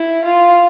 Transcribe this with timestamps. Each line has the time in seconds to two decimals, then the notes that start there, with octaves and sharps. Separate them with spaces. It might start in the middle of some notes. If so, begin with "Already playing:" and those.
Already playing: E4
0.24 F4